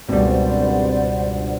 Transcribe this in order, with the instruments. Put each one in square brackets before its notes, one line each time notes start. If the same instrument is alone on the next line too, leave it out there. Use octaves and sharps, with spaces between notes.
[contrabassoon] G#1 [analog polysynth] C#2 G2 [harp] B2 G3 [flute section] C5 D5 F#5